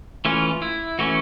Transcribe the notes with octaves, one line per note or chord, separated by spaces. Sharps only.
E3 A3 C#4 F4
E4
E3 A3 C#4 F#4